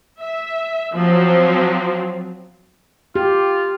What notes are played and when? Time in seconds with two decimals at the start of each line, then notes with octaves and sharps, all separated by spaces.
0.20 E5
0.95 F3 F#3 C4
3.16 F4 G4